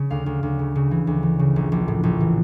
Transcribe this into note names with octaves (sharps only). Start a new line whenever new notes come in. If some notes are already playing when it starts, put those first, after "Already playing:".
Already playing: C#3
D2 F5
D2
D2
C#3
C#3
E3
D2
E3
C#3
A#1
A#1
A2
A#1
E3